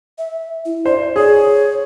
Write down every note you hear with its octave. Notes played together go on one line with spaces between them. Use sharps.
E5
E4
C5 D5
G#4 C#5